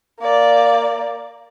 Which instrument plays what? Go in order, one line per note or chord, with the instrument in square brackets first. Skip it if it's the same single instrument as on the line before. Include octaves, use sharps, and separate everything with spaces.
[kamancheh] A#3 D5